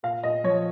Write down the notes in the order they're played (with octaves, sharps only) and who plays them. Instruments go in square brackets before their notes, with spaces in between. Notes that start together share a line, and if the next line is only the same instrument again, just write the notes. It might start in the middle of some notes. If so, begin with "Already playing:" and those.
[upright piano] A#2 F5
A#2 D#5
F3 C#5